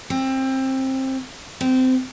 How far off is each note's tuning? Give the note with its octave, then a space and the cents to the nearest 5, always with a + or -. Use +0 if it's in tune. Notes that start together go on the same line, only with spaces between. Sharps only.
C4 +20
C4 -20